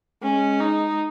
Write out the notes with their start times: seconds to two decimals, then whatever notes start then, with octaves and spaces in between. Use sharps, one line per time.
0.23 G#3 C#4
0.61 D#4